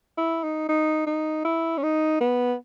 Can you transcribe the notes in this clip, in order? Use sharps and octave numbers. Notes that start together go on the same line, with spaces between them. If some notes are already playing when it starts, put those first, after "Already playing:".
E4
D#4
D#4
D#4
E4
C#4
D#4
B3